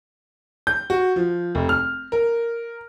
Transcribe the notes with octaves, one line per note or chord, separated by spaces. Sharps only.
G6
F#4
F3
F1
F6
A#4